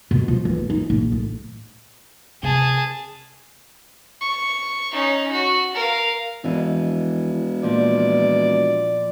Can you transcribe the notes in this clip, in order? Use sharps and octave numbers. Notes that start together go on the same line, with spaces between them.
B2
F3
E3
A3
D#4
A#1
A2
C3 G#4 A5
C#6
C#4 D#4
F#4
A#4 F5
E1 F2 E3
A#2 F3 D5